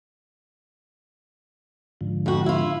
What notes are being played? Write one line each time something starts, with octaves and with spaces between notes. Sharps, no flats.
G#2 D3 F3
F2 F#4
E4 F4